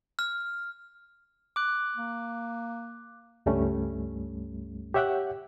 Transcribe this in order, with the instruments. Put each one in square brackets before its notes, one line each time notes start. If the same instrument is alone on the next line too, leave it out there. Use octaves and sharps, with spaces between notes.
[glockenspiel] F6
[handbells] D6 F#6
[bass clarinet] A#3
[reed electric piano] C#2 G2 G3 A3 C#4
G4 C#5 E5 F#5 G5 F#6